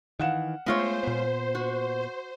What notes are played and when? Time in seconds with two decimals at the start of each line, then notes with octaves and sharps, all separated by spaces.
0.20 D#3 E3 F5 F#5 E7
0.66 G#3 A3 B3 F4 C5 C#5
1.03 A#2 B3
1.55 F#4